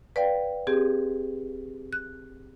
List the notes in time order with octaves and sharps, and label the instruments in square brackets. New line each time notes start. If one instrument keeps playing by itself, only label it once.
[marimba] B4 D5 F5 G5
C4 G4 G#4
F#6